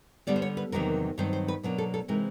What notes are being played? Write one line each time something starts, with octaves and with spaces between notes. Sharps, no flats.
D3 G3 B3 D5
C5
C#5
B4
E2 C3 D#3 F#3 A#3 A#4
G2 D#3 F#3 C4 C5
C5
B4
B2 F#3 A#3 D4
A4
A4
C3 E3 G#3 C4 D#4 A#4